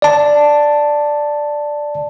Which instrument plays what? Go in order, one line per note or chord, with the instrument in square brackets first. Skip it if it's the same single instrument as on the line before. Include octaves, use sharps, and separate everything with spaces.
[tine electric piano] D5 A5